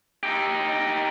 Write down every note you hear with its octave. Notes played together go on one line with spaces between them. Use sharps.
D#4 G4